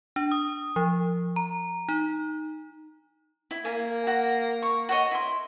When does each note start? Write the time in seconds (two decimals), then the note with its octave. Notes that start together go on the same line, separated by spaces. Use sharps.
0.16 D4
0.32 D#6
0.76 F3
1.36 A#5
1.89 D#4
3.51 E4
3.65 A#3 G#5
4.07 F#4
4.62 C#6
4.89 F#4 C#5 D#5
5.11 E4 C6